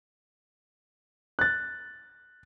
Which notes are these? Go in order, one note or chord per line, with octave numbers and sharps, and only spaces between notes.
F#6 A6